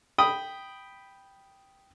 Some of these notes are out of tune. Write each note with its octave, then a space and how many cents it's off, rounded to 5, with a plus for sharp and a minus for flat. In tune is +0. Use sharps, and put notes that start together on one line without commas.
G5 +0 B5 +0 D#6 +0